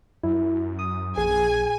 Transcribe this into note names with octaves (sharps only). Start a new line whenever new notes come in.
F#2 E4
D#6
A#1 G#4 G#5